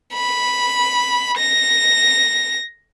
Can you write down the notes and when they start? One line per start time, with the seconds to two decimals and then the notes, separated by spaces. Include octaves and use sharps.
0.14 B5
1.37 A#6